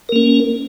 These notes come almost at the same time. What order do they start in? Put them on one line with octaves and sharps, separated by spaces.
A#4 A#3 C#4